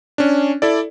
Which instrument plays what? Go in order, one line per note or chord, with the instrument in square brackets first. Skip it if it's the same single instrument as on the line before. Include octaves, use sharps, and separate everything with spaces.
[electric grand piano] C#4 D4
E4 A4 D5